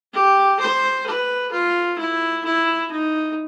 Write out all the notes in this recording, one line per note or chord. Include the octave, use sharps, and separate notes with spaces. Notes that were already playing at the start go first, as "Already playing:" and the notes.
G4
C5
B4
F4
E4
E4
D#4